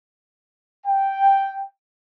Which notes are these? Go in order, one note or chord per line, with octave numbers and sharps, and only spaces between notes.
G5